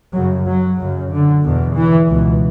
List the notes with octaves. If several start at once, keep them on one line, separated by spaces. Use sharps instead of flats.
F#2 C#3 F#3
F#3
F#2 C#3
D3
E2 B2
E3
C#2 B2